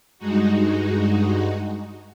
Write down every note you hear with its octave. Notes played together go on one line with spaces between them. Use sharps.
G2 G#3 D#4 F#4